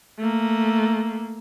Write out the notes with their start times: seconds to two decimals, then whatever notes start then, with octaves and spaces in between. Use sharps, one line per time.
0.18 A3 A#3